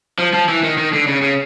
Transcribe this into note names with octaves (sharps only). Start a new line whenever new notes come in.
F3
F3
E3
D#3
D#3
D3
C#3
C#3